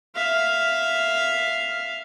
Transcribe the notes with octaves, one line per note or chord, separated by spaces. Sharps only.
E5 F5